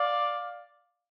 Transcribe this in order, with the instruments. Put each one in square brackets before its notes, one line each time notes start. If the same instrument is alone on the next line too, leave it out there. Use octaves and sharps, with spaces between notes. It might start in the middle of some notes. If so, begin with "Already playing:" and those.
Already playing: [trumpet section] D5 F5